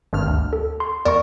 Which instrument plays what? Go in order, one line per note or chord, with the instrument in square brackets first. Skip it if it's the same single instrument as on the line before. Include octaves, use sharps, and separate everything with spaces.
[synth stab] G#1 G2 F6
D2
[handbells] A4
C6
[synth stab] E2 A#4 [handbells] D5 C#6